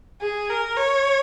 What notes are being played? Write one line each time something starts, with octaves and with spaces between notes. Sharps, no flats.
G#4
A#4
C#5